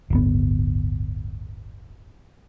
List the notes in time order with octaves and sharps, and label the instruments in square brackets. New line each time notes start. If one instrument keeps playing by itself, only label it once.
[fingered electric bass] D1 G1 B3